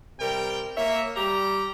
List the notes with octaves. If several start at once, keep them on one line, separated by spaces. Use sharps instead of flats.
C3 G3 A#4 G5
A#3 C#5 E5
G3 G4 A#5